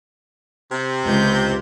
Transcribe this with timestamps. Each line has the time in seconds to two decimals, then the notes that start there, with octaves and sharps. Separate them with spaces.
0.72 C3
1.05 C#2 G6